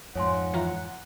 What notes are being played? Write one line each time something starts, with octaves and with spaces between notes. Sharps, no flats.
F2 G#2 C#5 F#5 G#5 C6
E3 F4 A#5